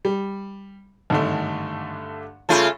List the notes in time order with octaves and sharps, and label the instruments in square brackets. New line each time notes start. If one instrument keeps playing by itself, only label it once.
[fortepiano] G3
[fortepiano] G#1 [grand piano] G2 D3 A3
[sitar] C#3 A3 F4 [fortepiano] A5 B5